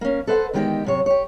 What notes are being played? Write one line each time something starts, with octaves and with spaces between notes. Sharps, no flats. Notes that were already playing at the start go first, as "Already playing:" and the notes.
A#3 C#4
A4 B4 C5 D#5 F#5
E2 D#3 G#3 G4 D5 G5
F#2 C3 C#5
G4 C#5